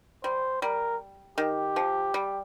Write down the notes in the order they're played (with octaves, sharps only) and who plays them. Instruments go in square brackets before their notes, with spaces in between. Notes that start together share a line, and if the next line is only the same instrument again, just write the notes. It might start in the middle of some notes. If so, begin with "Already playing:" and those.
[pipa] G3 [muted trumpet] C5
[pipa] G3 [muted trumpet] A#4
[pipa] D#3 [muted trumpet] G4
[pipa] F3
G3